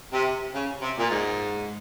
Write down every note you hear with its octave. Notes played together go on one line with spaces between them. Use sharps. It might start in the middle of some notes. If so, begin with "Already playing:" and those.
C3
C#3
C3
A#2
G#2